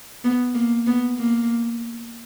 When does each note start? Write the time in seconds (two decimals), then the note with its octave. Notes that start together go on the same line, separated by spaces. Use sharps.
0.24 B3
0.55 A#3
0.87 B3
1.19 A#3